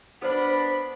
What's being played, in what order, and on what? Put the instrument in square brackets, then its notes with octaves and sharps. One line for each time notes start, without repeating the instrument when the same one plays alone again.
[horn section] B3 D4 B5 [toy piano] A4 B4 C5